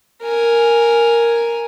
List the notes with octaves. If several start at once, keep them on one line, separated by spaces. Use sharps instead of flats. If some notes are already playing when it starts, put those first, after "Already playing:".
A#4 G#5